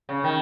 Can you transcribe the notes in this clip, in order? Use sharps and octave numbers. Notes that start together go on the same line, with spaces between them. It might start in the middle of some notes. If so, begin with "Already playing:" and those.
C#3
D#3